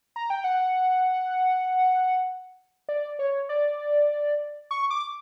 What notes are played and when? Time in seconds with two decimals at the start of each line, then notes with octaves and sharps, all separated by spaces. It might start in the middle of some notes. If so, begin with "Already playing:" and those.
0.16 A#5
0.30 G5
0.44 F#5
2.89 D5
3.19 C#5
3.49 D5
4.71 C#6
4.91 D6